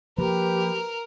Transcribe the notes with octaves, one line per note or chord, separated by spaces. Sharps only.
F3 A#3 G4 A#4 B4